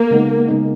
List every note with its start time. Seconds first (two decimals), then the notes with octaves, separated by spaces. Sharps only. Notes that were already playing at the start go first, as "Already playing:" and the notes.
Already playing: A#3
0.11 C#3 G#3 B3 D#4
0.48 C#3 G#3 B3 D#4